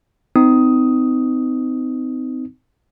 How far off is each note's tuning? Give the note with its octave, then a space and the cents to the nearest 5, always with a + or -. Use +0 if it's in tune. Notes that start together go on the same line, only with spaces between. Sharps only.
C4 -30 D#4 +0 D#6 +10